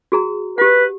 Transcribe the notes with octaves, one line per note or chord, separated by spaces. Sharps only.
F#4 G#4 A#5
G4 B4 F#5